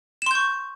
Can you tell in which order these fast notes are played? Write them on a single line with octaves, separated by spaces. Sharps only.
E7 C6 G6 C#6